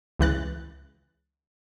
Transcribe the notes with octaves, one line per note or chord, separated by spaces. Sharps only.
C#2 E3 F#6 A6